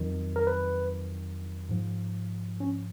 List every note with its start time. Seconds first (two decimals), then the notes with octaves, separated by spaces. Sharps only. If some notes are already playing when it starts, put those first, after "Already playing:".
Already playing: F2 D#3 F#3
0.36 A#4
0.47 B4
1.69 G#2 F3
2.60 C#4